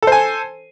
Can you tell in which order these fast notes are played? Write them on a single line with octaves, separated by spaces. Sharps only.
A4 C5 G#5